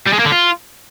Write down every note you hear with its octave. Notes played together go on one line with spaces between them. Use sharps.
G3
G#3
A#3
D3
F4